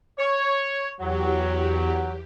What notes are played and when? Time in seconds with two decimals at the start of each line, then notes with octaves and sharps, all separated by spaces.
0.17 C#5
0.99 E2 F#3 G4